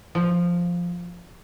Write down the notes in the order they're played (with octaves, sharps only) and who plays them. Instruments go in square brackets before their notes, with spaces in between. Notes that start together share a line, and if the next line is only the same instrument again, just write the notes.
[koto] F3